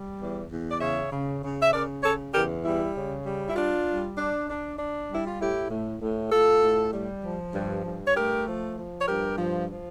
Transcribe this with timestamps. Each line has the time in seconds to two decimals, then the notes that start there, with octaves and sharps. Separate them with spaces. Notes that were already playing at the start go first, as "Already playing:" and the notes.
Already playing: G3
0.20 E2
0.50 E2
0.71 D5
0.81 C#3 C#5 E5
1.12 C#3
1.42 C#3
1.62 E5
1.73 C#3 A#4 D5
2.04 C#3 A4 C#5
2.34 E2 G4 A#4
2.65 G3 E4
2.95 C#3
3.26 G3
3.49 E4
3.56 D4 F4
3.88 G3
4.18 D4
4.49 D4
4.79 D4
5.10 G3 E4
5.27 F4
5.40 A2 E4 G4
5.70 A2
6.01 A2
6.31 A2 F4 A4
6.62 A2
6.94 G3
7.24 F3
7.55 G2
7.85 G2
8.07 C#5
8.15 A3 G4 A#4
8.46 F3
8.77 F3
9.01 C#5
9.07 G2 G4 A#4
9.38 F3
9.69 F3